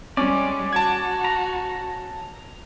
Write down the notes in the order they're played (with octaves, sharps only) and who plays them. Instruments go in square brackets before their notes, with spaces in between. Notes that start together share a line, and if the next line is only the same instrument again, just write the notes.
[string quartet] G3 G#3 [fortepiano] C#4 [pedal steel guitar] D5
[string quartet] F#4 [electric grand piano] A5 G#6
[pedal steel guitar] A#5